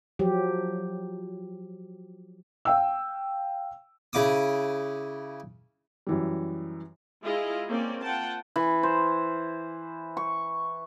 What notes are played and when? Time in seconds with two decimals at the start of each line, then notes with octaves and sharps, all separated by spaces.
0.19 F3 F#3 G4
2.65 F5 G5 E6
4.13 C#3 E4 D6 D#6
6.07 F#2 E3 G3
7.23 G#3 E4 F4 G#4 D#5
7.68 A#3 C4 C#4 D5
8.03 F4 F#5 G5 A5
8.56 E3
8.83 C5
10.17 C#6